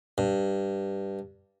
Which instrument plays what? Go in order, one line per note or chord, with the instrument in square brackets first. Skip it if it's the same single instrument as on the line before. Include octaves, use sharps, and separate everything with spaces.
[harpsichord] G2